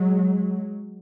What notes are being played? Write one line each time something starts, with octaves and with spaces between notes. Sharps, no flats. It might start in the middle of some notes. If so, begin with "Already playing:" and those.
Already playing: F#3 G#3